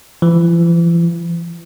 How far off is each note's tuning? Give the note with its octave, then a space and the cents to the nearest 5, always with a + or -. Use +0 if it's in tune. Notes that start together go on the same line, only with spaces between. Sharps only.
E3 +45